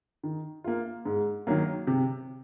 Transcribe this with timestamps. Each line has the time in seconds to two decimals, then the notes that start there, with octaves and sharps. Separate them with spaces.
0.23 D#3
0.64 A#3 F4
1.05 G#2
1.47 D#3 F#3 A#3
1.87 C3